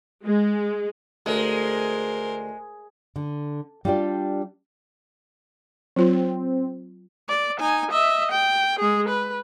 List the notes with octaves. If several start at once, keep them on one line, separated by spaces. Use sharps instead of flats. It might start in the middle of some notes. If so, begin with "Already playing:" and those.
G#3
D2 G#3 A#4 C5
D3
G3 D4 F4 G4 D5
F#3 C4 F4
D5
D#4 G#5
D#5 E5
G5
G#3 G#4
B4